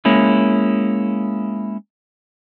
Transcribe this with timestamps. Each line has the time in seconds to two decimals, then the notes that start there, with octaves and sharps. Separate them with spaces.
0.05 G#3 A#3 C#4 E4